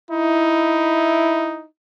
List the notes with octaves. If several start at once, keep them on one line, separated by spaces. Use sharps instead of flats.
D#4 E4